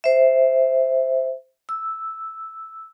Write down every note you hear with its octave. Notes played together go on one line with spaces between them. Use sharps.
C5 E5
E6